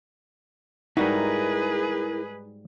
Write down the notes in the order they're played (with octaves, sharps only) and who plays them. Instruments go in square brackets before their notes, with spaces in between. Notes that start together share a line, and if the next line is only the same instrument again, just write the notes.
[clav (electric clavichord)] G#2 G3 F#4 [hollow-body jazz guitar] D#4 [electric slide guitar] E4 A#4 [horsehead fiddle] G#4 B4